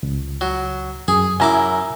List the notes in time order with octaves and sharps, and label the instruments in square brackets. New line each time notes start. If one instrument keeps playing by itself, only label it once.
[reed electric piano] C#2
[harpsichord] F#3
[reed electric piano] F#2 [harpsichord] G#4
[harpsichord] F#2 E4 D6 [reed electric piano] G#5 A#5